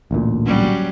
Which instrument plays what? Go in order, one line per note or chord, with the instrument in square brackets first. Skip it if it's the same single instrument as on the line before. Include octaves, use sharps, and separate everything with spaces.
[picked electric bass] A1 D2 A#2
[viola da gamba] F#3 G3 C#4